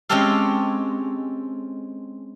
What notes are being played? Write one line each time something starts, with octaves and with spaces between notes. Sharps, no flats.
G#3 C4 C#4 G4 A4 F5